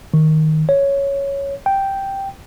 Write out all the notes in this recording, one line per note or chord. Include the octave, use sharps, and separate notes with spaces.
D#3
C#5
G5